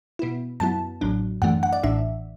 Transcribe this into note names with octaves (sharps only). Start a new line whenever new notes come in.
B2 B3 E4
F#2 F#3 B3 E4 A5
A1 A2 F#3 D4
F#2 E3 A3 D4 F#5
F#5
D5
A1 A2 E3 D4 E5